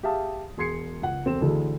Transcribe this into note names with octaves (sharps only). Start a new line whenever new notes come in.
G4 G#4 E5 F5 A5 D#6
E1 G#4 C6 G#6 C7 C#7
C#2 F#5
E1 C4 A4 E7
A1 D2 D3 E3 G#4 A4